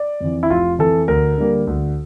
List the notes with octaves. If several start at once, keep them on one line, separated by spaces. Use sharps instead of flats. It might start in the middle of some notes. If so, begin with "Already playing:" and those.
Already playing: D5
F2 E3
E4
F1 F4
F2 E3 A4
D2 A#4
D3 G3 A#3
D2